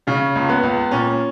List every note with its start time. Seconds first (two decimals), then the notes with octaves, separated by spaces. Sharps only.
0.07 C#3 C#4
0.35 C#2
0.49 B3
0.63 C#2
0.91 A#2 C#4